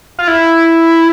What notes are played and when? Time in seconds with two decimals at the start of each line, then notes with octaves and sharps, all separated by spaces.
0.19 F4
0.28 E4